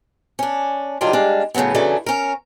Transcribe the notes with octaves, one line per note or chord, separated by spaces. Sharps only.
C#4 D4
C3 D#3 F#3 G3 D4 F4
G3 G#3 D4 F5
A2 C#3 E3 F#3 B3
E2 C#3 E3 F#3 A3 D4
C#4 A#4